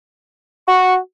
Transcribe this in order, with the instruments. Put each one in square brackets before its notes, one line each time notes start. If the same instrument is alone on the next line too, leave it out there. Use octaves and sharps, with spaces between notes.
[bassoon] F#4 [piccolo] C#6